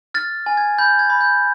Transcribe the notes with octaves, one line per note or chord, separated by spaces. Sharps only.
F6 A6
G#5
G#6
B5 G6
G#6
B5
G6